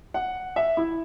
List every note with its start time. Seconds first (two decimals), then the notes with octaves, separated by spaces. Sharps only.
0.14 F#5
0.56 E5
0.77 E4